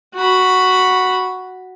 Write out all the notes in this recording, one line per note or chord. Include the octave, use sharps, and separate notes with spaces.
F#4 B5